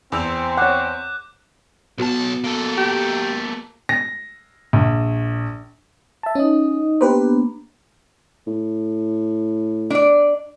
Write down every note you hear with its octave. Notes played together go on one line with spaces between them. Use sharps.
E2 C4 E6 F7
C#5 F#5 D6 F#6 G6
B1 B3 F#4 A5
A#3 A4
G4
A#6
A#1
E5 A5
C#4 D#4 D#5
A#3 B3 D4 G4 B4 C5
A2
D4 D5